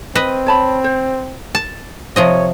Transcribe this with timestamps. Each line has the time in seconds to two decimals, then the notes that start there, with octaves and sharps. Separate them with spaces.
0.15 C4 B4 D#5
0.47 C#5 A5 B5
0.84 C5
1.55 A5
2.16 C3 F3 C#5 D#5